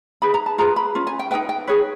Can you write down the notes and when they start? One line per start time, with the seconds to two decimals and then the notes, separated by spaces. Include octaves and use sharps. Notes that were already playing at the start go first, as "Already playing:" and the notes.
0.22 D#4 G#4 B4 B5
0.34 A#5
0.46 A5
0.58 F4 G#4 B4 A#5
0.76 B5
0.95 C#4 F4
1.07 G#5
1.19 G5
1.31 D#4 G#4 B4 G5
1.49 G5
1.67 D#4 G#4 B4 C#5